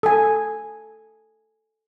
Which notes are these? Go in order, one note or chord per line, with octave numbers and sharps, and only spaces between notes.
A4 G#5